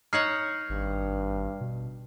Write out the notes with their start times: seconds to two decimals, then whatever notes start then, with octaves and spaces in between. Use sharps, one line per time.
0.13 D#4 C#5 F#5 F6 C7
0.69 G#1 G2
1.61 B2